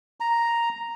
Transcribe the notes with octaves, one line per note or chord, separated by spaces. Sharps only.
A#5